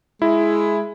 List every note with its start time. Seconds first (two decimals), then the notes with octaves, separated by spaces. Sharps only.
0.22 G#3 E4